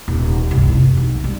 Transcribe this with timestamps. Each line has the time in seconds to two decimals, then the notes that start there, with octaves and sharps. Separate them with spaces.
0.08 D#1
0.51 C2 G2
0.66 F2
0.97 B1
1.24 G3